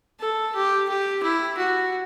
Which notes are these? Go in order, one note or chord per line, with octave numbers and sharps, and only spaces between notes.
A4
G4
G4
E4
F#4